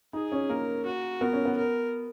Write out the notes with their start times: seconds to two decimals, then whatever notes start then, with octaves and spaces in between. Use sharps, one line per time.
0.13 D#4 G#4
0.32 C#4
0.49 A#3 A#4
0.85 F#4
1.21 B3 A#4
1.33 C#4
1.45 B3
1.57 A#4